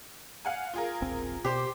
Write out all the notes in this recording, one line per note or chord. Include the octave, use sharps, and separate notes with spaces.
F5 F#5 G#5
F4 G#4 A#4
E1 A#1 C4
B2 G4 C5 D6